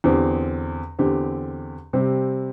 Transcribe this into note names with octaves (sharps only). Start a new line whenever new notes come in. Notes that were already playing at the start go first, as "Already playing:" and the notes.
E2 D3 C4 G4
E2 D3 C4 G4
C3 G3 C4 G4